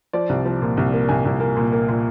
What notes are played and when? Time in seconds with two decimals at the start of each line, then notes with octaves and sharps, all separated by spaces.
0.13 F3 D5
0.29 C2
0.45 F3
0.62 A#2
0.77 C2
0.94 A#3
1.09 C2 G#5
1.25 C2
1.40 A#3
1.57 A#2
1.73 A#3
1.89 A#2